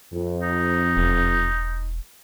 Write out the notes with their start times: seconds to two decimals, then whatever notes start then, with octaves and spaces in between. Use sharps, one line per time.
0.12 F2
0.43 D#4
0.97 E1